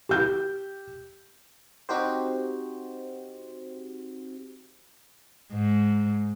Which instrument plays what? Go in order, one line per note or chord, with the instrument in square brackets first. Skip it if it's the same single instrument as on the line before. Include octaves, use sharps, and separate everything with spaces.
[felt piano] G4 G6
[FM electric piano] C4 D#4 F#4 G4 C5
[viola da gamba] G#2